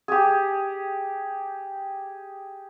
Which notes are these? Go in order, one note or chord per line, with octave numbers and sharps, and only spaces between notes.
G4 G#4